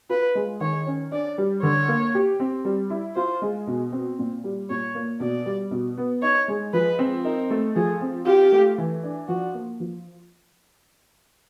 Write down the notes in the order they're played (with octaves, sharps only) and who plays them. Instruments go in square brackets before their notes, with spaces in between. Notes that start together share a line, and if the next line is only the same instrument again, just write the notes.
[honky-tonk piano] F4 [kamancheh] B4
[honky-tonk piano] G#3
[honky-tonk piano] D#3 [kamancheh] C#5
[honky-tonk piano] C#4
[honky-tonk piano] D4 [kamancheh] D5
[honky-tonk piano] G3
[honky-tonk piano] D3 [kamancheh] C#5
[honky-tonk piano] A#3
G4
C4
G3
E4
[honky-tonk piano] F4 [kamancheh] C5
[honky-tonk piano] G#3
B2
C4
A#2
G3
[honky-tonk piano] A#2 [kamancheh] C#5
[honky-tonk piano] A#3
[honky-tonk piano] B2 [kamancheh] D5
[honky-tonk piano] G3
B2
B3
[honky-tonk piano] D#4 [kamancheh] C#5
[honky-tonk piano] G#3
[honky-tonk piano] F3 [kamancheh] B4
[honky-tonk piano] C4
[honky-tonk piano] D#4 [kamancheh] A#4
[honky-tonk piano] A3
[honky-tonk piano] F3 [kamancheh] G#4
[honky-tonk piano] C4
[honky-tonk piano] F4 [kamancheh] G4
[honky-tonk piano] A3
E3
D4
[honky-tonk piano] F3 [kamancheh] F#4
[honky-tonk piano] A#3
F3